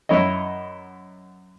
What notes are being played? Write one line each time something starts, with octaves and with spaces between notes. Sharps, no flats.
F#2 E4 C#5 D#5